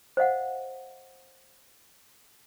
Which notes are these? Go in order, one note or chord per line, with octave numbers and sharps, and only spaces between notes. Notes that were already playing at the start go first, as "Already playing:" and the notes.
C5 D#5 F5 F#5